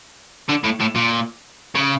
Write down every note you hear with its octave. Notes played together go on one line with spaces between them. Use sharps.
D3
A2
A2
A#2
C#3